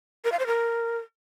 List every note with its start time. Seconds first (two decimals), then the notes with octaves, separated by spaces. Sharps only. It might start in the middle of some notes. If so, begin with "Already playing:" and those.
0.24 A#4
0.32 F5
0.39 C5
0.47 A#4